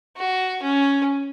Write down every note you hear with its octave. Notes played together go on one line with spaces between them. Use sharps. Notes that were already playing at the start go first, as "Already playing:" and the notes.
F#4
C#4